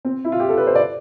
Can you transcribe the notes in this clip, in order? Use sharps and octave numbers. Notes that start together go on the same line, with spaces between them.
C4
E4
F4
G4
A4
B4
C5
D5